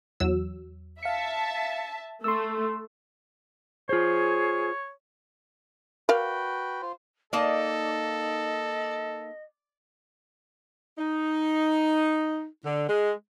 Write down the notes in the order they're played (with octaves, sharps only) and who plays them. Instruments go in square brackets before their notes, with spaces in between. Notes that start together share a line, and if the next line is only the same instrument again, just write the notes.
[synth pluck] E2 F#3 E6
[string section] E5 A5 [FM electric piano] F5 C#7
[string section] A3 [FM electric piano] C6 E6
[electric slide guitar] F4 C5 [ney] G#4 [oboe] C#5
[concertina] F#4 B4 G5 [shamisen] A#4 D5 F5
[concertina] F4 C5
[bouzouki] A#3 D#4 A5 [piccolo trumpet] A4 [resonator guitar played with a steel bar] D5 [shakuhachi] D#5
[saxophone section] D#4
D3
G#3